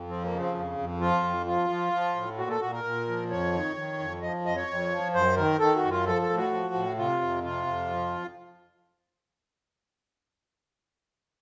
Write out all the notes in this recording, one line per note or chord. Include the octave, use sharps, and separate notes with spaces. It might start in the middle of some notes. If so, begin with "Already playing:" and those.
Already playing: F2
F3 C4
A#3
C#3
C4
F2
F2
F3 F4
F2
F3 F4
F3
F3
A2
A#2 F#4
A4
A#2 F#4
A#4
A#2
F3
F2 C#5
D#3
D#3
F2
F3 D#5
F2 D#5
C#5
F2
F3
F#2 C5
D#3 A#4
D#3 A4
F#4
F#2
F4
F3 A4
A4
A2
F#4
F3
A2
C3 F4
F2
C3 F4
F2
F3